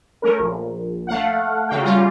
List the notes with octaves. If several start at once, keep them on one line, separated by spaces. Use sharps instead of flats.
A3 C#4 A#4
A#1
A3 F5 F#5
C#3 A3 F#4 F5 G5
G3 C#4 F4 A#5